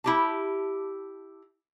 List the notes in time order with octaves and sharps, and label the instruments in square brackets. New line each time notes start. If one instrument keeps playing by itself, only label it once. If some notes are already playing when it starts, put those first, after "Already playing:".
[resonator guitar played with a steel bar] E4 G4 A5